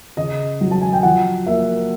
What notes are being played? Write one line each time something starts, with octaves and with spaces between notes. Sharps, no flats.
C#3 D#5
F#3
A5
G#5
G5
F3 F#5
A#3 E5